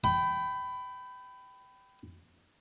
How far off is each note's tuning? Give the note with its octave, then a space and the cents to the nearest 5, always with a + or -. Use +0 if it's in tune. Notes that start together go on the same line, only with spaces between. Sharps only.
G5 -15 B5 +20